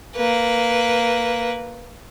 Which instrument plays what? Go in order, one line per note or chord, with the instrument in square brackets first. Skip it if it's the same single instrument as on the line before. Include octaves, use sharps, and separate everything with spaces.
[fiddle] A#3 B4